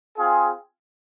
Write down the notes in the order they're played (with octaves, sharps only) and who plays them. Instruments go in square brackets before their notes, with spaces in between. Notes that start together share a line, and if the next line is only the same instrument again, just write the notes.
[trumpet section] C4 F4 G#4